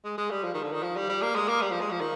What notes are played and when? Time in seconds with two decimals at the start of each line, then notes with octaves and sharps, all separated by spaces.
0.04 G#3
0.18 G#3
0.31 G3
0.44 F3
0.54 D#3
0.63 D3
0.73 D#3
0.83 F3
0.96 G3
1.09 G3
1.22 A#3
1.36 G#3
1.48 A#3
1.61 G3
1.71 F3
1.81 G#3
1.91 F3
2.01 D#3